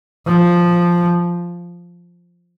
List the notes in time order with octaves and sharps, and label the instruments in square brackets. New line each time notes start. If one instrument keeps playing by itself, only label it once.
[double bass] F3